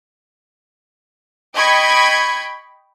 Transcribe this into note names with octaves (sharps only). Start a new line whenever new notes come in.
D#5 G5 B5 C#6 G#6